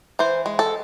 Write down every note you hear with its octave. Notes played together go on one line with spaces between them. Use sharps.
E3 C5
G#3
A4